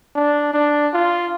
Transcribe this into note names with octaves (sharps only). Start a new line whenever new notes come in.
D4
D4
F4